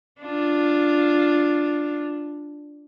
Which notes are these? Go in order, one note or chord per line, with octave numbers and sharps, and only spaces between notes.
D4 F4